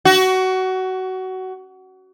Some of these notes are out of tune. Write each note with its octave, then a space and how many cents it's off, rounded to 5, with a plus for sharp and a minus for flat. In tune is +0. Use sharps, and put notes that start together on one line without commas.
F#4 +20